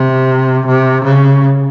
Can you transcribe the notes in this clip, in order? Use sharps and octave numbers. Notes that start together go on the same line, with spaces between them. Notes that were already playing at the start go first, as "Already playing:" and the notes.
Already playing: C3
C3
C#3